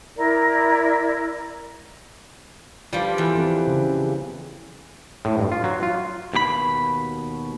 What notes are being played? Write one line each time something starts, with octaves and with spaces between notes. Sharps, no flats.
E4 A#4 D5
F3 G3 F4 B4 D5
E2
F3 C4 A4
C#3 E3
A2
G2
F4
F#3
F4
D#2 B2 G4 B5